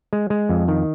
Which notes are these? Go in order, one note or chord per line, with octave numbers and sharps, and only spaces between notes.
G#3
G#3
F2
D#3